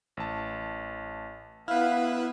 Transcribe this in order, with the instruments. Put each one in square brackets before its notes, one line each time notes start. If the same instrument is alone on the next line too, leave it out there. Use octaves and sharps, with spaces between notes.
[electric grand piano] A1 A5
[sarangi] B3 [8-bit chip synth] E4 B4 [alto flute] F5 [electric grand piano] F6